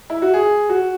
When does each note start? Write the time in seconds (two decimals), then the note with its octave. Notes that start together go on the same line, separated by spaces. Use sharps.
0.10 E4
0.22 F#4
0.34 G#4
0.69 F#4